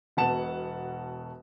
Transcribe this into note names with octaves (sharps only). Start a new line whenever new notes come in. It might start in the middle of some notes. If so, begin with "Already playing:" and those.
E1 B2 F#5 A5 E7